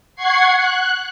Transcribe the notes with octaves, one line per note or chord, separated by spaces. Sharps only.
F#5 C#6 G#6 C7
F#6